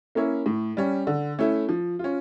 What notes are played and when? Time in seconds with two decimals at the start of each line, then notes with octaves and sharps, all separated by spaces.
0.15 A#3 C#4 E4
0.46 A2
0.77 G3 C#4
1.07 D3
1.39 A3 C#4 E4
1.69 F3
1.99 C#4 F4